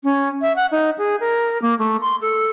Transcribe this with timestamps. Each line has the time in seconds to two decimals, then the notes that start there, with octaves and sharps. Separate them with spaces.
0.04 C#4
0.41 E5
0.56 F#5
0.72 D#4
0.98 G#4
1.20 A#4
1.62 A#3
1.79 A3
2.01 C6
2.21 A4